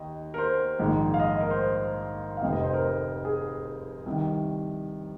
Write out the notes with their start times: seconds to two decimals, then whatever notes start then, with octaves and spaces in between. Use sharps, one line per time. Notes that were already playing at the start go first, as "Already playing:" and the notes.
Already playing: D#2 D#5
0.34 A#4
0.38 C5
0.79 A#1 G#2 D#3
1.14 F5
1.19 D#5
1.41 A#4
1.50 C5
2.37 F5
2.43 F1 F2 C3 D#5
2.53 D#5
2.64 C5
2.74 A#4
3.25 G#4
4.06 C2 C3 D#3